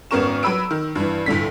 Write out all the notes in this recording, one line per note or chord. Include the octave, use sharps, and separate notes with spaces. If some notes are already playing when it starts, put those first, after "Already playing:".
G#1 B3 C#4 A#4 C#6 E7
F#3 B4 B5 E6 D7
D#3
G2 E3
G1 A2 D3 B6